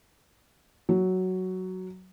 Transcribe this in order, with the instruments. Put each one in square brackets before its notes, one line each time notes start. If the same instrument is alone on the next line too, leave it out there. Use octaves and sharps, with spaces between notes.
[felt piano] F#3